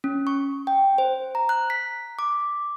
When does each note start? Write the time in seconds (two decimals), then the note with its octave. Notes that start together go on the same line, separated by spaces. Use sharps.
0.04 C#4
0.27 C#6
0.67 G5
0.98 C5
1.35 A#5
1.49 F#6
1.70 B6
2.19 D6